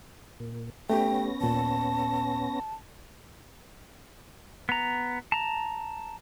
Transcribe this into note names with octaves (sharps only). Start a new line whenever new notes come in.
A#2
A3 B3 C#4 G4 G5 A#6
D#2 A#2 A5
B3 A#5
A5 A#5